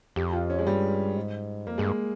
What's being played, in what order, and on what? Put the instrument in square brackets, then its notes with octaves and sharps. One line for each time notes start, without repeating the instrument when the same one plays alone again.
[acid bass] F2 [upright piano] G4
[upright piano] F4
C#4
G#3
[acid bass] G2 [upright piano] G3
[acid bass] G#2
[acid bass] F2 [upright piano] A#3
[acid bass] G2 [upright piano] G#3
[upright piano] A#3